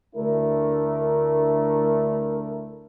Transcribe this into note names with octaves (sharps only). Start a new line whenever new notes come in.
D2 A3 D4 E4 A#4